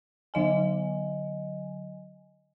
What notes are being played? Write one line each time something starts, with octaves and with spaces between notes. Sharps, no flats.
D3 F#3 D#5 G#5